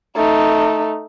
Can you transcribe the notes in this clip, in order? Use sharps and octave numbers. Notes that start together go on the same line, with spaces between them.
A3 D#4